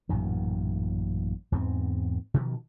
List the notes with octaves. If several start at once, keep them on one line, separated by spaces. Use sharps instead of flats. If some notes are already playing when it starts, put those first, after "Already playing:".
A1 F#2 A#2 D#3
E2 G#2 B3 C4
B2 D#3 F3